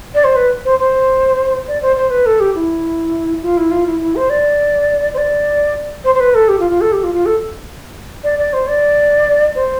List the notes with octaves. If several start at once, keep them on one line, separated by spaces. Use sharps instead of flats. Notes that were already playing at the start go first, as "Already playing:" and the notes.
D5
C5
B4
C5
C5
D5
C5
C5
B4
A4
G4
E4
F4
E4
F4
E4
E4
C5
D5
C5
D5
C5
C5
B4
A4
G4
F4
F4
A4
G4
F4
F4
A4
D5
D5
C5
D5
C5